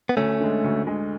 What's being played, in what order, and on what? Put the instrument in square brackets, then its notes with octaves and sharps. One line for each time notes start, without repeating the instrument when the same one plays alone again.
[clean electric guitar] B3
[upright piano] D2 [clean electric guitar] A3 C#4
[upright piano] D3 G#3
D2
D3 G#3